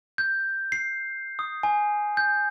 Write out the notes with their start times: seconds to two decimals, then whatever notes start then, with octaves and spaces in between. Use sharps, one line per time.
0.18 G6
0.72 C7
1.39 D#6
1.63 G#5
2.17 G6